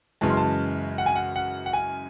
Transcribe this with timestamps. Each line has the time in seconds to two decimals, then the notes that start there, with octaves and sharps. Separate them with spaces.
0.21 F#2 C#3 E3 G#3 A5
0.30 C6
0.37 A5
0.98 F#5
1.06 G#5
1.16 F#5
1.36 F#5
1.66 F#5
1.73 G#5